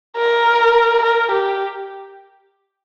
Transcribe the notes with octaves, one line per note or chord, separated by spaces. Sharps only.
A#4
A#4
G4